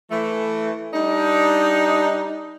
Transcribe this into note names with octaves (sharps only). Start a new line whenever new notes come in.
E3 A3
G3 D4 D#4